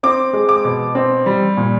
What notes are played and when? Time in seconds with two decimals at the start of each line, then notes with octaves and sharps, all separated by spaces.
0.03 C4 D6
0.33 G#3
0.49 D6
0.65 B2
0.95 C4
1.26 G3
1.57 A#2